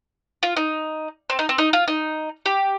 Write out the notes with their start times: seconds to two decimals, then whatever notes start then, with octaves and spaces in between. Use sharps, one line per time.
0.43 F4
0.57 D#4
1.30 C4
1.39 D#4
1.49 C4
1.58 D#4
1.73 F4
1.88 D#4
2.46 G4